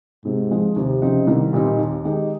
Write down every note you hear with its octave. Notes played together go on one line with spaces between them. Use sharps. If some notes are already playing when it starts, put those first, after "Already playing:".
G#2 C3
F3 G#3
D#2 C3
C#3 F3 C4 D#4
C2 D#3
A#2 G3 C4 D#4
D#2
D#3 G#3 D#4 G4